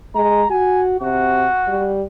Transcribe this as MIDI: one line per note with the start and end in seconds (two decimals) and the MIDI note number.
0.15 0.43 56
0.15 0.48 82
0.50 0.98 66
0.50 0.82 80
1.01 1.46 48
1.01 1.95 66
1.68 2.03 55